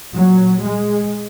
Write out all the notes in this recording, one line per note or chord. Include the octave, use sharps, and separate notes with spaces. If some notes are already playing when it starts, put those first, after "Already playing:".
A#2 F#3
G#3